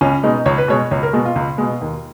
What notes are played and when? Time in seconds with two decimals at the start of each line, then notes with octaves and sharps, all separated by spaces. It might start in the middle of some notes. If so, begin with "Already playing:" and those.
0.01 C#2 C#4
0.23 B2 G#3 D#4
0.46 C#2 C#5
0.58 B4
0.68 B2 G#3 C#5
0.91 C#2 C#5
1.03 A#4
1.13 B2 G#3 F#4
1.25 F4
1.36 C#2
1.58 B2 G#3
1.81 D#2